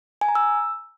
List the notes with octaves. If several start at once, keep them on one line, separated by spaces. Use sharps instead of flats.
G#5
A#5
E6